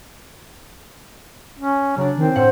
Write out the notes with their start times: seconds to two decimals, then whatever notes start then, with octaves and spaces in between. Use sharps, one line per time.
1.58 C#4
1.97 C#3 F#3 D4
2.17 D#3 C4
2.36 A2 C5 F#5